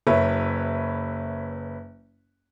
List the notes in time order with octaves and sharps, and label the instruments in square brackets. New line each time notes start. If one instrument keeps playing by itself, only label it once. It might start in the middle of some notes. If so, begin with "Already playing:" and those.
[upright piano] F#1 B4 C#5 E5